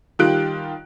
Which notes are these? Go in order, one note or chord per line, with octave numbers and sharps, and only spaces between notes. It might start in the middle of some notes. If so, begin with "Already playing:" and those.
D#3 G3 F4 G4 F#6 D7